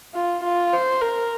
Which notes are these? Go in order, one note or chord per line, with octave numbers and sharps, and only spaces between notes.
F4
F4
C5
A#4